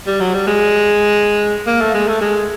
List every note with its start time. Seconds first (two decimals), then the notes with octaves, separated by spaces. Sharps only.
0.07 G3
0.20 F#3
0.34 G3
0.47 G#3
1.67 A#3
1.81 A3
1.94 G#3
2.08 A3
2.21 G#3